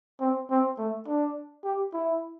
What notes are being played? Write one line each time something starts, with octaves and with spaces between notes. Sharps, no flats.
C4
C4
A3
D4
G4
E4